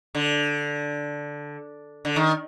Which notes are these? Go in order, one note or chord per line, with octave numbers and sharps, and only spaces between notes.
D3
D3
D#3